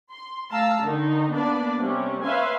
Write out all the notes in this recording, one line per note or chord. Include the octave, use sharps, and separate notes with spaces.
C6
A3 F5 A5 A#5 E6
D3 D#3 D#4
A#3 B3 D4 B4 D5
C3 G3 C#4
B4 C#5 E5 F5 G#5 C6